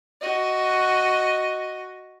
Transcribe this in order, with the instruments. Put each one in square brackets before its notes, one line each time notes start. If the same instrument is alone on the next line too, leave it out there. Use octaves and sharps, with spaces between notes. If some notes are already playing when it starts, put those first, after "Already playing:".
[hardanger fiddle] F#4 D#5